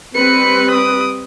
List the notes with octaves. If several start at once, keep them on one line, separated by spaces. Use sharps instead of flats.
G3 C4 B4 C#7
D#6 D7